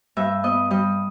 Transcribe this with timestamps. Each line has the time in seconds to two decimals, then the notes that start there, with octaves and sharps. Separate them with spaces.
0.17 G2 E5
0.43 B3 D#5
0.71 G3 D#5